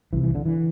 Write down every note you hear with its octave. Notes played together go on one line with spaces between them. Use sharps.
C2 C3 E3
E3
D3
E3